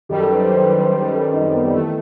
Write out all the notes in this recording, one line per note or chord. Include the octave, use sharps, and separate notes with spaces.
F#2 D#3 G3 G4
A4
B4
C5
C5
B4
C5
C5
B4
A4
D#4
C4
B3
G3
D#3 E3 A3